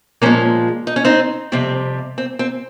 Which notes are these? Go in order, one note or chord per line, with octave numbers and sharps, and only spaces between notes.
A#2 F3 G#3 A#3 C#4
D#4
C#4
C4 D#4
F2 C3 G3 C4
C4
C4